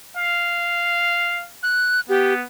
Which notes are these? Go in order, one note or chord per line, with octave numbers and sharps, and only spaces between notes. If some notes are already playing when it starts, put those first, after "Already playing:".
F5
F#6
B3 G4